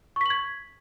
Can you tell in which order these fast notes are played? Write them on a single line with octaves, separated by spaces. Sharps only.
C#6 B6 F#7 G#6